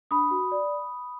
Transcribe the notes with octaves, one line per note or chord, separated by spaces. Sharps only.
D4 B5 D#6
F#4
D5